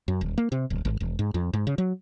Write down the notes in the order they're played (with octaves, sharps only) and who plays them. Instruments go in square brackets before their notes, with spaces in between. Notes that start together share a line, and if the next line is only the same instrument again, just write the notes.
[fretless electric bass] F#2
D#1
A#3
C3
D1
G#1
E1
G#2
F2
G#2
C#3
F#3